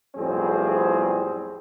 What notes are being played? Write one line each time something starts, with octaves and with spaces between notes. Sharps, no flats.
B1 F2 A2 G3 C4 G#4